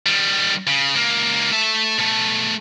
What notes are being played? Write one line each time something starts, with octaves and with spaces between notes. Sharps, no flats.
D#3 G3
C#3
C#2 A#3
A3 E5
B2 A3